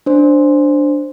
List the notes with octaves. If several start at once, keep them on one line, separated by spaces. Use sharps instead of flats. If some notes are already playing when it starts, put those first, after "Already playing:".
D4 C5